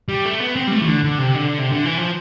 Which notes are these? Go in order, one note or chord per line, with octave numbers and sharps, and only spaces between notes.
G3
A3
B3
C4
G3
A3
E3
D3
D3
C3
D3
C3
D3
E3
F3